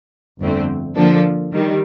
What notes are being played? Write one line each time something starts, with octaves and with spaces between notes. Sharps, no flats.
G1 F2 D3 A3 C4
D3 F3 A#3 D4 A4
D#3 G3